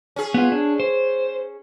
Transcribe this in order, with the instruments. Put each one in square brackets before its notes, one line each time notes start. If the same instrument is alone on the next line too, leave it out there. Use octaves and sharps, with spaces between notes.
[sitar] C#4 G#4
[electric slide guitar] B3 F4
D4
C5